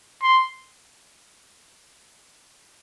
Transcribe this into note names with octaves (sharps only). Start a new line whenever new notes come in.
C6